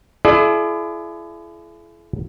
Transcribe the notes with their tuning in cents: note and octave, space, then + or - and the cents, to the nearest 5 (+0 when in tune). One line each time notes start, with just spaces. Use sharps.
E4 +35 G#4 +45 D5 +40